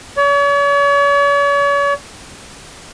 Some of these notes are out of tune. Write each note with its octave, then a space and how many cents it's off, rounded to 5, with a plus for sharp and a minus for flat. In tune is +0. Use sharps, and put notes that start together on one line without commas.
C#5 +40